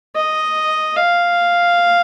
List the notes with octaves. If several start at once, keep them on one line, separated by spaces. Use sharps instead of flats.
D#5
F5